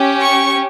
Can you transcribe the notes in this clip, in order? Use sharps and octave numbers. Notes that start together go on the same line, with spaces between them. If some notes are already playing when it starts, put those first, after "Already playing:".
Already playing: C#4 G4
C#6